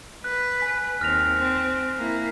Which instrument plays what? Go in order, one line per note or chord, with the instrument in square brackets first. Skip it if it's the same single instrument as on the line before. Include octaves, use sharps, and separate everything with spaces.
[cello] B4 [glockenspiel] F#6
[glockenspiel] G#5 F#6 B6
[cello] D#2 C4 [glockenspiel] F6 A#6 F7
[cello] C4
A#3 E4